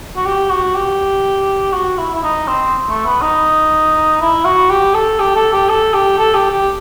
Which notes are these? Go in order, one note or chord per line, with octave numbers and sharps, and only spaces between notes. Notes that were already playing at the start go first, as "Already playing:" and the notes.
F#4
G4
F#4
G4
F#4
E4
E4
D#4
C4
A3
B3
D#4
E4
F#4
G4
A4
G4
A4
G4
A4
G4
A4
G4
G4